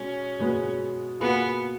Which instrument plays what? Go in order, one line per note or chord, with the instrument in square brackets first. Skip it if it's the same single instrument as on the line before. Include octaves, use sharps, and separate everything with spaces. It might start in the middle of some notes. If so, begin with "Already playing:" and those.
Already playing: [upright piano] B2 G#3 [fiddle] C#4
[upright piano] B2 G#3 B3
[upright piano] B2 A#3 F4 G#4 B4 [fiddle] B3